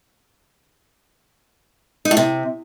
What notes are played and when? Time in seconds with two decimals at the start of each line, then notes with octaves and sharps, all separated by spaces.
2.05 D#4
2.11 A2
2.17 C3